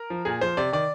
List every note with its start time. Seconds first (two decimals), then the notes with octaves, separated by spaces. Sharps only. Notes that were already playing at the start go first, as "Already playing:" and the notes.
Already playing: A#4
0.10 F3
0.25 A#2 G#4
0.41 F3 C5
0.57 C3 D5
0.72 D#3 D5